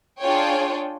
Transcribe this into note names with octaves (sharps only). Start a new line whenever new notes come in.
D4 F4 G#4 C#5 G5